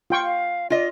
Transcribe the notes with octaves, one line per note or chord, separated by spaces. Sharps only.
F4 G5 C#6
F5
F4 D5 D#5